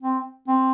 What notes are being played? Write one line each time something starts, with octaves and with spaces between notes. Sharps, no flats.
C4
C4